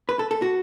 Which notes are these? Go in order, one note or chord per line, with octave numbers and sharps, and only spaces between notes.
B4
A4
A4
F#4